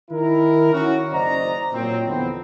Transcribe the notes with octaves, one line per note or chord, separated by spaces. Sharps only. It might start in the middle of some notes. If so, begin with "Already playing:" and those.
D#3 E4 A#4
C#4 E4 F#4
F#1 C5 D5 D#5 A#5
A#2 F#3 C4
E2 D3 F3 B3 C4